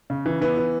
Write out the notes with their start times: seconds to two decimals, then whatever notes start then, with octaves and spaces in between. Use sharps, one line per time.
0.10 C#3
0.26 E3
0.41 E3 B3
0.58 E3